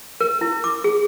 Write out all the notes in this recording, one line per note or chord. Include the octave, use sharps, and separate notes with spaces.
A#4
E4
D6
G#4